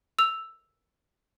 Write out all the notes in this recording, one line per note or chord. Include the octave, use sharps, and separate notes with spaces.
E6 F7